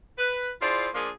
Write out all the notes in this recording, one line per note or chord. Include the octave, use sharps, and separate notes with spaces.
B4
E4 F4 G#4 C5 D5
F3 A#3 D4 F4 G#4